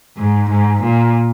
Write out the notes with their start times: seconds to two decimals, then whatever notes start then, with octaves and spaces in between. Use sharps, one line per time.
0.17 G#2
0.50 G#2
0.83 A#2